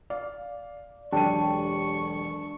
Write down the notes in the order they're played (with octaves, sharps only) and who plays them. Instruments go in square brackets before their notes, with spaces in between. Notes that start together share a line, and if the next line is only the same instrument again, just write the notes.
[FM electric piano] D5 [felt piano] F5
[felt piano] E1 C#5 D#7 [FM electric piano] F#3 G4 A4 [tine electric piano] D4 [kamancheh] C#6